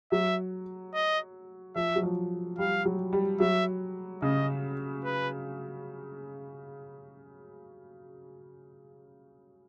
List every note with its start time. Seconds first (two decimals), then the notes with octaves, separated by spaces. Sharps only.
0.12 F#3 E5
0.94 D#5
1.76 F3 E5
1.96 F#3
2.03 F3
2.58 G3 F5
2.85 F#3
3.13 G3
3.40 F#3 E5
4.22 C#3 D#5
5.04 B4